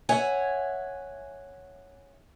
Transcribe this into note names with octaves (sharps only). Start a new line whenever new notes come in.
C#5 E5 F#5 G#5